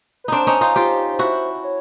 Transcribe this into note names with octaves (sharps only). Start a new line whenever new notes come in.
B4
C4 D4 D#4 C5
C#4 D#4
D#4 F4
F4 G4
E4 F#4
C#5